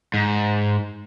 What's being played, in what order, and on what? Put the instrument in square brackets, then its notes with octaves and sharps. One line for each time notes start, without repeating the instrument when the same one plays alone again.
[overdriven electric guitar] G#2